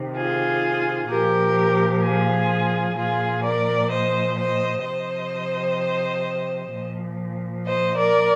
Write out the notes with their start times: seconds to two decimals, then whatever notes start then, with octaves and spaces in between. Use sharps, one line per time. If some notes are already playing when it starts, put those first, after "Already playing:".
Already playing: C3 D#3
0.16 F4 G#4
1.09 A#2 F3 G4 A#4
2.03 F4 G#4
2.97 A#2 F3 F4 G#4
3.44 A#4 D5
3.91 C5 D#5
4.38 C5 D#5
4.85 C3 F3 C5 D#5
6.73 A#2 F3
7.66 C5 D#5
7.97 A#4 D5